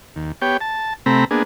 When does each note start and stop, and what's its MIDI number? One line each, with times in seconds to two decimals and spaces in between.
0.16 0.32 39
0.42 0.57 59
0.42 0.57 67
0.42 0.57 73
0.42 0.57 79
0.61 0.94 81
1.06 1.25 48
1.06 1.25 57
1.06 1.25 60
1.06 1.25 82
1.06 1.25 83
1.31 1.43 58
1.31 1.43 59
1.31 1.43 62
1.31 1.43 68